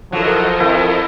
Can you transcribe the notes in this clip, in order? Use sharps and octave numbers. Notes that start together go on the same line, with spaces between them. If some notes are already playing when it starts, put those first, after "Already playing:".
F3 F#3 E4 A4 A#4 D#5
F2 E4